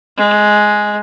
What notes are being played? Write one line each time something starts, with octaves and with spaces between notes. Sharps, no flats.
G#3